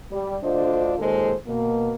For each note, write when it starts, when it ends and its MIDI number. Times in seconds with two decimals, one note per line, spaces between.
0.11 0.36 55
0.43 0.94 38
0.43 0.94 50
0.43 0.94 62
0.43 0.94 65
0.43 0.94 72
0.43 0.94 75
0.99 1.32 39
0.99 1.32 46
0.99 1.32 56
0.99 1.32 68
0.99 1.32 69
0.99 1.32 72
1.47 1.94 47
1.47 1.94 58